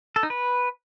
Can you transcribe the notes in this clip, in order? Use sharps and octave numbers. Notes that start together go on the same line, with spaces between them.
A4
D#4
B4